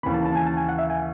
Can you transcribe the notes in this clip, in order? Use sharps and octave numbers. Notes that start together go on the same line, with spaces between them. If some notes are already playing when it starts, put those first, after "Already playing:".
D#2 C#3 E3 B5
A5
A5
G#5
A5
G#5
F#5
E5
G#5